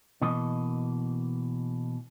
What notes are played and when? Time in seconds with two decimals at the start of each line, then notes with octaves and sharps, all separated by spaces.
0.22 B2 E3 A#3 D#5